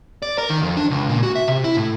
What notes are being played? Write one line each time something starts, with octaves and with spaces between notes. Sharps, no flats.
D5
A#4
D#3
F2
D4
C#2
A#2
F#4
E5
C3
E4
A2